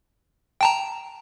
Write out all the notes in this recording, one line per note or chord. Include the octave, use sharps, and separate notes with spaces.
G5 A5 A#5